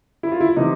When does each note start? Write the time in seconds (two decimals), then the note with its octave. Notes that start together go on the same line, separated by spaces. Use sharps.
0.23 E4
0.32 F4
0.41 E4
0.56 C3 E3 D#4